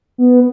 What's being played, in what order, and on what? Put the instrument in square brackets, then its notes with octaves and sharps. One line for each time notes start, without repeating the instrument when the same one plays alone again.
[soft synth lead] B3